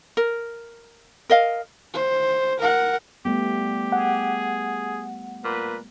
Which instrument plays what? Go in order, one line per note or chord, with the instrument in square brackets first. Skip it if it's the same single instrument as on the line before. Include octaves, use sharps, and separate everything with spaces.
[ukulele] A#4
A#4 D#5 F5
[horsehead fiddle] C5
A#4 F#5
[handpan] G3 A3 B3 [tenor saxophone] G4
[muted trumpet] G#4 [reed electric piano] F#5
[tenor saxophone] A#2 [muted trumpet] B4